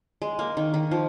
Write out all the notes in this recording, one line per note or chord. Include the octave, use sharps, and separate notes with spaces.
G#3
A#3
D#3
D#3
F3